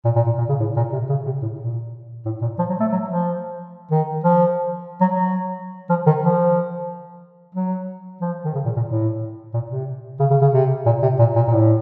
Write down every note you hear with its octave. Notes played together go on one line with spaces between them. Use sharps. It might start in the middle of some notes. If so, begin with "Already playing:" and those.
A#2
A#2
A#2
A#2
C#3
A2
A#2
C3
C#3
C3
A2
A#2
A2
A#2
F3
F#3
A3
F#3
F3
D#3
F3
F#3
F#3
F3
D#3
F3
F#3
F3
D#3
C#3
A#2
A#2
A2
A#2
C3
C#3
C#3
C#3
C3
A#2
C3
A#2
A#2
A#2
A2